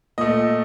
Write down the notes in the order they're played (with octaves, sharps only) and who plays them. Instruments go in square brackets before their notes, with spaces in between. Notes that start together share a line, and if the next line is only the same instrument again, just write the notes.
[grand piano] A#2 A3 D#5